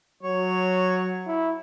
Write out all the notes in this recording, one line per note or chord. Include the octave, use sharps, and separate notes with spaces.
F#3 C#5
E4